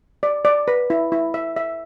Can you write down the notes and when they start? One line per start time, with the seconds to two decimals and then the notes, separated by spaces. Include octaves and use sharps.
0.23 D5
0.45 D5
0.68 B4
0.90 E4
1.12 E4
1.34 E5
1.56 E5